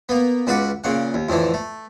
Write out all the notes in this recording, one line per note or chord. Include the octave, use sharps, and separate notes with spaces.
A#3 B3
C#2 F#4 B4 D5 F#5
A#2 C#3 F#5
D#2
F2 A2 D3 E3
A3